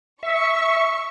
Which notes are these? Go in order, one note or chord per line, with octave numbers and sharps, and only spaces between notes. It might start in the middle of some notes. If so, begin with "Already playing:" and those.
E5 C#6